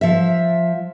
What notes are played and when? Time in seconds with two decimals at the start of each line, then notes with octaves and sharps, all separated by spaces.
0.01 F3 E5